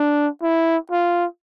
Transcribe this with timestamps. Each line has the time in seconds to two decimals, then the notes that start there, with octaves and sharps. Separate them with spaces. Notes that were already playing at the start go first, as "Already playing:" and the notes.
Already playing: D4
0.42 E4
0.91 F4